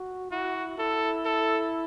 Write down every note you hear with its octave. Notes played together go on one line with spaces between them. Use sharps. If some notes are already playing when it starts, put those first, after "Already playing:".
Already playing: F#4
E4 F#4
E4 A4
A4